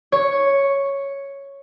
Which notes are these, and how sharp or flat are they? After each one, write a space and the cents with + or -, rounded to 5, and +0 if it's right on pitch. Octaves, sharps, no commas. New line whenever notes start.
C#5 +0